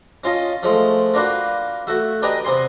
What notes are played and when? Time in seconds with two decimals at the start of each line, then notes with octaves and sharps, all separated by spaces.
0.24 C#4 F4 D#5 A5
0.63 F3 G#3 A3
1.14 A#3 D4 F4 F#4 B4
1.87 A3 F#4 E5
2.22 D4 G4 B4 D#5 G#5 A#5
2.45 C3 B3 G#5 C6